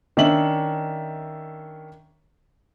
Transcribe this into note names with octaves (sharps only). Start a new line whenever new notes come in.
D#3 C#4 D4 E5 F#7